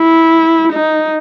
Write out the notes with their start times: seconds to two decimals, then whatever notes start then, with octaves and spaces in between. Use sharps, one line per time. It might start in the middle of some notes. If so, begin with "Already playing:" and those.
Already playing: E4
0.73 D#4